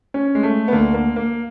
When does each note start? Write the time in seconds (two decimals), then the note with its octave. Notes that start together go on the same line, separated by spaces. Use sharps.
0.14 C#4
0.35 G#3
0.43 A3
0.68 B3
0.72 D2 D3 A#3
0.94 A#3
1.16 A#3